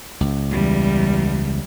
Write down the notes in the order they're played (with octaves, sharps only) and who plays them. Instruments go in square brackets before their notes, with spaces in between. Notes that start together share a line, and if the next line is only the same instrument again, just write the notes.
[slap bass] C#2
[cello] E2 G3